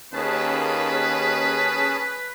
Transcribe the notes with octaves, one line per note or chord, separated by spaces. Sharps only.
D#2 C#4 G#4 B4 A5